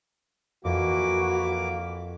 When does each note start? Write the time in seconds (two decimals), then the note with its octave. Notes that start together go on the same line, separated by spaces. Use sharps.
0.65 F2 E3 A#3 F#4 D6